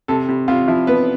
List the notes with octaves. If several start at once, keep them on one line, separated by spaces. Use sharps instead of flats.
C3 A4
C3
C3 F4
F3 E4
B3 B4